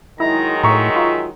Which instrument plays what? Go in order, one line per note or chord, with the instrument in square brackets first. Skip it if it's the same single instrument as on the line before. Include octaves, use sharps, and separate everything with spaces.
[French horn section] D#3 F#3 G#3 [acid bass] E4 [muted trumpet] A#5
[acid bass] A2 [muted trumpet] E5 [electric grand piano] A#5 C#6
[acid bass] F4